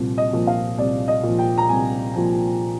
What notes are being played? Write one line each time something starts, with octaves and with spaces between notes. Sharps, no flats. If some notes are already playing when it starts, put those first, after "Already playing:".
Already playing: C2 A#2 F3
D#5
A#2 F3
F5
C2 D5
D#5
A#2 F3
G5
A#5
C2 G#5
A#2 F3